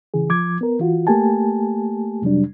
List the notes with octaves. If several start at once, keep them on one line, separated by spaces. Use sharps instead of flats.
C#3 E3 G#4
F3 D6 G#6
B3 A#4
E3 F4 F#4
A3 A#3 G4 G#5 A5
F2 C3 F#3 G3 D4